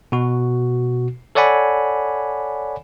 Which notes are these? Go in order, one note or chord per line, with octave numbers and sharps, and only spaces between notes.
B2 F#4
A4 C#5 D5 F#5 G#5 B5